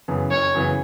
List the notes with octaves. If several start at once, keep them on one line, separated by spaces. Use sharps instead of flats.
F#2 C#3 E3 B3
F#1 C#5
F#2 C#3 E3 B3